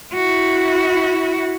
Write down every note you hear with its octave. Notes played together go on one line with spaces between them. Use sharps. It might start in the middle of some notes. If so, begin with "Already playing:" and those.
E4 F#4